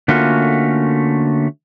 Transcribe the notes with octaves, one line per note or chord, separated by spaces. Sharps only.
D3 A3 A#3 C#4 F4 F#4